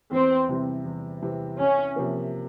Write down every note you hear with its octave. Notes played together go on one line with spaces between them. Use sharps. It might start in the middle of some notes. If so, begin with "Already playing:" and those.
E2 C4
C3 E3 G3 C4
E2
C3 E3 G3 C4
C2 C#4
C3 F3 A#3